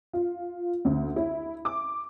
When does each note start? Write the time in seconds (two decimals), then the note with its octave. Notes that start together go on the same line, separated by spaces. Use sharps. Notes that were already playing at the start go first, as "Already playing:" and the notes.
0.13 F4
0.85 D2
1.16 E4
1.65 D6